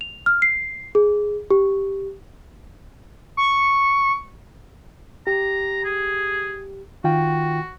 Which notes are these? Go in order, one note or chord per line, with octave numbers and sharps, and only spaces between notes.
F7
F6
C7
G#4
G4
C#6
G4 A#5
G#4
D#3 F4 F#4 G5